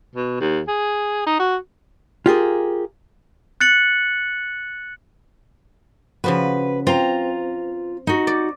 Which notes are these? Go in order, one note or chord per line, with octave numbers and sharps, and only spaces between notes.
B2
D#2
G#4
D#4
F#4
F4 G4 G#4 A#4
F#6 A6 C#7 F#7
C#3 F3 F#4 B4
C4 F4 A#5
D#4 F#4
D5